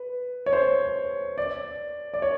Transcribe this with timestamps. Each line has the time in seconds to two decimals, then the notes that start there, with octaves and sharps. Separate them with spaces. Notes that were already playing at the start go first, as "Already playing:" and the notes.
Already playing: B4
0.46 C#5
0.53 C5
1.38 D5
2.14 D5
2.22 C#5